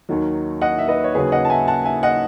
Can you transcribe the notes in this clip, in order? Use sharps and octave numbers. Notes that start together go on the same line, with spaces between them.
D#2 D#3 F#3
D#5 F#5
E5
B4 D#5
C#5
D#2 C#3 F#3 G#4 B4
D#5 F#5
A5
E5 G#5
F#5 A5
E5 G#5
D#5 F#5